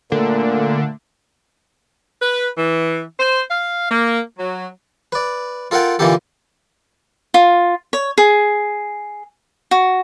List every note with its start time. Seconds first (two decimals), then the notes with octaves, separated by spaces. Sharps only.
0.12 A#2 D3 A3 A#3
2.22 B4
2.58 E3
3.19 C5
3.50 F5
3.91 A#3
4.39 F#3
5.12 B4 D5
5.71 F4 A4 A#4 F#5 G5
5.99 A#2 D3 E3 A#3 G4 A4
7.34 F4
7.93 C#5
8.18 G#4
9.71 F#4